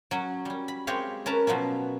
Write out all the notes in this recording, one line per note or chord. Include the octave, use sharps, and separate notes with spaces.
F#3 C#4
G3 C#4
B5
G#3 C4 G4 C#5 F5
C#4 A#4 B4 A5 A#5
B2 F3 F#3 C#4